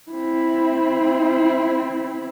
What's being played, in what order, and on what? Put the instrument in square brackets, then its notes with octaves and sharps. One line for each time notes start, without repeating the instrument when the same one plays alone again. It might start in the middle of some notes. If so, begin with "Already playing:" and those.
[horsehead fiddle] C4 E4